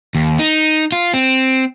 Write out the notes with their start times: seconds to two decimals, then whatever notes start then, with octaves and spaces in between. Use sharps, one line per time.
0.15 D#2
0.39 D#4
0.92 F4
1.14 C4